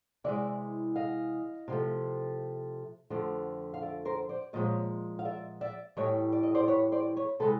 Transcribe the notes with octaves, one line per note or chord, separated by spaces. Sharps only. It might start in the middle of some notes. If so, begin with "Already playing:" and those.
C3 E3 G#3 D5 E5
D#5 F5
C3 F3 A3
F2 D3 F3 A3
F5
D5 E5
A#4 C5
C5 D5
A#2 F3 G#3 C#5 D#5
F5
D5 E5
D5 E5
A2 E3 G3 C#5 D#5
D5
D#5
C5 D5
B4 C#5
C5 D5
B4 C#5
C3 E3 G#3 A4 B4